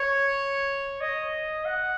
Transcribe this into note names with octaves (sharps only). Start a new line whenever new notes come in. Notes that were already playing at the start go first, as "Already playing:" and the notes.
Already playing: C#5
D#5
F#5